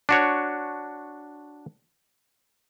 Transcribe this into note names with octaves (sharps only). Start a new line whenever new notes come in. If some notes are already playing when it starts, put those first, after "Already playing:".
D4 F#4 C#5